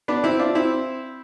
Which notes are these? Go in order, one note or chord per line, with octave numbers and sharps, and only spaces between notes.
B3 D4
C4 E4
D4 F4
C4 E4